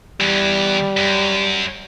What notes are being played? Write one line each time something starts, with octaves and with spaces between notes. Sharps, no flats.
E2 E3 G3
F#2